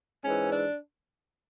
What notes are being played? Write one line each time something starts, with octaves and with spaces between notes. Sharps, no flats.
G#2 E3 C#4
D4